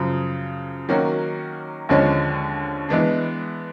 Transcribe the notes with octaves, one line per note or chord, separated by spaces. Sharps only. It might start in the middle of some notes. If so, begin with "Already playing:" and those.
Already playing: F#2 C#3 F3
D#3 F#3 A#3 C#4 F#4
D#2 D3 F3 G#3 C#4
E3 G#3 B3 D4